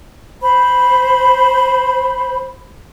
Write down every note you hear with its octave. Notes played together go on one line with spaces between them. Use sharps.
C5 B5